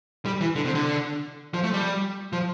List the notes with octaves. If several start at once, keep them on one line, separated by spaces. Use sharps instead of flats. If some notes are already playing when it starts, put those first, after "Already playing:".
G3
E3
D3
C3
D3
F3
A3
G3
F3